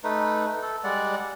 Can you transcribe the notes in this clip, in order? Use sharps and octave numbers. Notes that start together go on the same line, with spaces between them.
A3 D#4 B4
A4
G3 G#3 D5 F#5